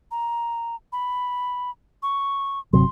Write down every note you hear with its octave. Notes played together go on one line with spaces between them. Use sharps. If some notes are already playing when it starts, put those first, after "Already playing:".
A#5
B5
C#6
G1 C3 F#3 C6